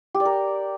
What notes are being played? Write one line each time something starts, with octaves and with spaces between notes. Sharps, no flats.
G4
D5
A#4